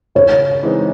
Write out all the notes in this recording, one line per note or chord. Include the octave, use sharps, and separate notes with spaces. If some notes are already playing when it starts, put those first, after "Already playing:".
C#3 C#5
E3 G#3 C4 D#4